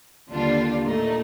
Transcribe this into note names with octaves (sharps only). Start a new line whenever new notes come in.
D#2 D3 G3 D4 F4
A#2 A3 D#4